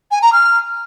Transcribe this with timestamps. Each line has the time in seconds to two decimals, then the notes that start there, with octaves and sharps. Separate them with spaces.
0.11 G#5
0.22 A#5
0.32 F6